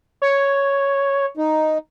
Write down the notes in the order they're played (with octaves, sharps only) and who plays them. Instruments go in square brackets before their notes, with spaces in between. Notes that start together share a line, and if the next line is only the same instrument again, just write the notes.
[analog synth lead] C#5
[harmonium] D#4